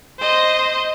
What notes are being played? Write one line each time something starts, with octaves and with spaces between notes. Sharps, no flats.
C5 D#5